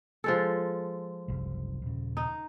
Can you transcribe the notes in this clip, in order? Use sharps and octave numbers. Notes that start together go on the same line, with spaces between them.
F3 G#3 A4
F#1 C2
D#1 C#3
D#4